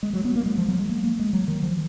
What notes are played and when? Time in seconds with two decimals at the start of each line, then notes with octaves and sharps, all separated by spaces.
0.03 G#3
0.13 F#3
0.25 B3
0.36 A#3
0.46 G#3
0.58 F3
0.68 F#3
0.79 G#3
0.89 A#3
1.04 A#3
1.19 G#3
1.33 F#3
1.48 D#3
1.63 F3